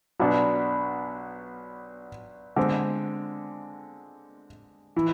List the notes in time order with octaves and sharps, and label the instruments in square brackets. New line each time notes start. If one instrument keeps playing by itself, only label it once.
[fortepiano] B1 B2 B3 D4
D3 G#3 C4
E3